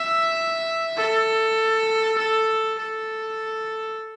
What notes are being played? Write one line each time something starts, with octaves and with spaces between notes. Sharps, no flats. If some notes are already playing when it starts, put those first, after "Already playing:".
Already playing: E5
A4
A4
A4